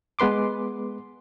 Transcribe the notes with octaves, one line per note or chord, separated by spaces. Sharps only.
G#3 B3 B4 C6 D6